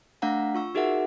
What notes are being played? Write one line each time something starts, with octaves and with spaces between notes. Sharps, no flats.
A3 D4 F5 F#5 A#5
F4 C#6 E6
D#4 F#4 G#4 A#4 E5 F#5